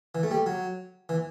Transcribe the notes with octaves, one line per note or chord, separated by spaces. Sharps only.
E3
A3
G3
F#3
E3